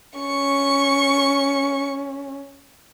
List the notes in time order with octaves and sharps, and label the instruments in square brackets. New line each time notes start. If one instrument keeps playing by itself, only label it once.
[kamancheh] C#4 [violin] C#6 C#7